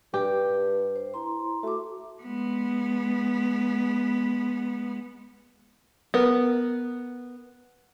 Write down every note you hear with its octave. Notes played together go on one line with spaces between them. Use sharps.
G2 G4
C5
E4 A#5 C6
A3 F#4 D6
G#3 B3
B3 A#4